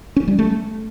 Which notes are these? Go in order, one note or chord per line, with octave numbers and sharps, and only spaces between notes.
C#4
G3
A3